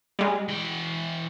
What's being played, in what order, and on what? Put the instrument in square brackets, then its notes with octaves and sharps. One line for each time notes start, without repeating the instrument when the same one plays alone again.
[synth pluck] G3 G#3
[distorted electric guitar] E3 G5